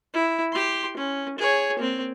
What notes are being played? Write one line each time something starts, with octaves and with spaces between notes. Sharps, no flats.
E4
G4 C6
C#4
G#4 C#5
A#3 C4